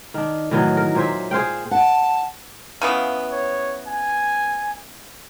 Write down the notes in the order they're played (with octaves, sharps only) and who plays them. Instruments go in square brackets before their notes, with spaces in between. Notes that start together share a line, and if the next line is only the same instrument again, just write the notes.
[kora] D#3 D4
A2 D#3 E3 F#3
A#4
A#2 C5 E5
G#4 C5 F5 G5
[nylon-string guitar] F#5 [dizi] A5
[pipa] C#3 E3 B3 [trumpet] F5
[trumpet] C#5
G#5